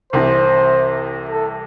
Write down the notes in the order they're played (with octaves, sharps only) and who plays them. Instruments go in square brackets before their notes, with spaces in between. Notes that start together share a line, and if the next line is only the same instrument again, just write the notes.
[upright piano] C2 C3 E3 [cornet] C5
[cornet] A4